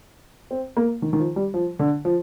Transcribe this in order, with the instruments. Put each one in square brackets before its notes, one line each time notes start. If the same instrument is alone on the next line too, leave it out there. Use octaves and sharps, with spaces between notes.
[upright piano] C4
A#3
D#3
D#3
F3
G3
F3
D3
F3